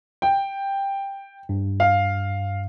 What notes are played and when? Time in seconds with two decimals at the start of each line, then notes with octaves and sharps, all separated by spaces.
0.22 G5
1.49 G2
1.80 F5